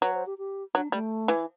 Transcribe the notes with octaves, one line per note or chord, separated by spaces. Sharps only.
F#3 B4
C5
G4
G4
F#3 D4
G3 A3
E3